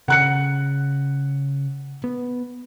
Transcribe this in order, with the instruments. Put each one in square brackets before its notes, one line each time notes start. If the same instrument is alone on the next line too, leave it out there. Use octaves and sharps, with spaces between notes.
[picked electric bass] C#3 [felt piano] F#5 F#6 C#7
[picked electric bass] B3